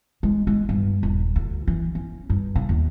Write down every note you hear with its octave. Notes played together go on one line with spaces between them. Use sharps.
G#3
G#3
G2
D#1
D2
E3
C#4
G2
C#3
D#2